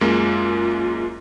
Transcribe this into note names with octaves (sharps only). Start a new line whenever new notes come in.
F#2 G#3 A#3 F4